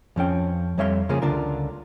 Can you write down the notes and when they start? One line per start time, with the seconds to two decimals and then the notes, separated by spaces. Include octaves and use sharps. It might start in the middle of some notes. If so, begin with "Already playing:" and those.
0.16 F2 F3 C#4 G5
0.78 F2 G3 C#5 E5 F5 C6
1.09 C#3 F3 A#3 C#4 G#4
1.22 C#2 D3 D4 F4 A#4